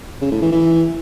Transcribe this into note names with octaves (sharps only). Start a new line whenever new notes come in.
C#3
A2
E3
E3